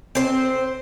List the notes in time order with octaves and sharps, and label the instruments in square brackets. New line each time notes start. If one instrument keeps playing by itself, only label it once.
[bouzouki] C4 C5